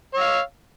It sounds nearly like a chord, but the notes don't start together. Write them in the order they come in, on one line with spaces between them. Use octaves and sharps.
C#5 E6 F5